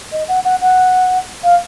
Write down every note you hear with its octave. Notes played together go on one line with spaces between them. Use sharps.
D#5
F#5
F#5
F#5
F5